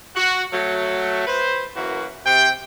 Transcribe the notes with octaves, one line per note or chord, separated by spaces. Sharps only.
F#4
F#3 A3
B4 C5
F#2 E3 A#3 F#4
C3 G5